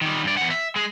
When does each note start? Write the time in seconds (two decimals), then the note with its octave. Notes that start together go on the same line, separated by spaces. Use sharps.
0.01 D#3 G3
0.23 G2 D5
0.37 E2 F#5
0.50 E5
0.76 G#3 G#4